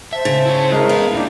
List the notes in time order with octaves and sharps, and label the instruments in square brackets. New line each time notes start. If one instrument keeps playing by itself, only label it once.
[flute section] C5 A5 [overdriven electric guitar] E5
[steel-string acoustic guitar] C#3
[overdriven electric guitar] E4 C#5
[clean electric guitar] G#3 A#4
[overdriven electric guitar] B3 E4 [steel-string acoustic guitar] F5
[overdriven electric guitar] D#2 A#2 [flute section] D4 D#4 G4